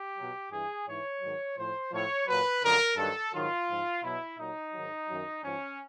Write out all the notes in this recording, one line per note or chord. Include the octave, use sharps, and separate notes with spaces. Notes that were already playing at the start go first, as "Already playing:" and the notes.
Already playing: G4
B2 F#3
G2 E3 G#4
G#2 E3 C#5
G#2 D#3 F#3
A2 F3 C5
A2 F3 C#5
A#2 F#3 B4
F#2 D3 F3 A#4
G2 D#3 F#3 A4
G#2 D#3 F#3 F4
G#2 F3
B2 F#3 E4
A#2 F#3 D#4
G#2 D#3 F#3
F#2 D#3 F#3
G#2 F3 C#4